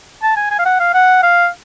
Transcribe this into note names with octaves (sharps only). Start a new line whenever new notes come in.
A5
G#5
G#5
F5
F#5
F5
F#5
F5